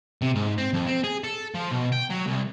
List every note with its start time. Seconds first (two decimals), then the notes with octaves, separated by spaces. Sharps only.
0.22 C3
0.35 G#2
0.58 C4
0.73 F2
0.87 C4
1.04 G#4
1.24 A4
1.55 F3
1.71 B2
1.92 G5
2.10 F#3
2.26 C2